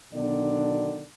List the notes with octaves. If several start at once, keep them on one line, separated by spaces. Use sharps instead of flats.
B1 B2 D3 D#3 D4 D5